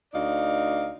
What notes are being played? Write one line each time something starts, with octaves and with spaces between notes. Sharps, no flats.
D2 D#4 D5 F5